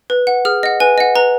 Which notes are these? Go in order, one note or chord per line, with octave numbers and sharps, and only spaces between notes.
B4
F#5
G#4 F6
D#5 F#5
B4 G#5
D#5 F#5
B4 A#5